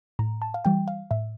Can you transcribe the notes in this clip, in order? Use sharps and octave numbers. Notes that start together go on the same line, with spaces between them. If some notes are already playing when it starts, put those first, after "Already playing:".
A2 A#5
A5
F5
E3 G3 G5
F5
A2 E5